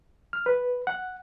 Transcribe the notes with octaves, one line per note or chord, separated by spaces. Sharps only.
F6
B4
F#5